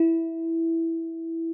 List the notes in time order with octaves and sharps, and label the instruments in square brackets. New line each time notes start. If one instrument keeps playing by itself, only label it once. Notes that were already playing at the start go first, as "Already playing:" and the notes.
Already playing: [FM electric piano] E4